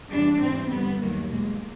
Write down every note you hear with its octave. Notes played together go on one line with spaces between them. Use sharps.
E2 C3 E3 G3 D4
G#2 E3 G3 C4
G2 D3 G3 B3
D#2 D#3 F#3 A#3
E2 B2 G#3 A#3